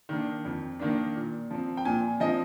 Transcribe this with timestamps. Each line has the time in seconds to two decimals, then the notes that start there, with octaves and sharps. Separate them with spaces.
0.09 D#3 A#3 D4
0.45 F2
0.80 D#3 A#3 D4
1.16 A#2
1.51 F3 C4
1.77 G5
1.85 A#2 G#5
2.20 F3 C4 D#5